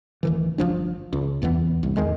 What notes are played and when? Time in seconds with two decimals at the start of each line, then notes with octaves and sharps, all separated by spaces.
0.23 D1 D#3 E3
0.58 G1 F2 F3 D4
1.13 C#2
1.42 D#1 E2 E3 B3
1.83 C2
1.97 D1 E2 D#3 G#3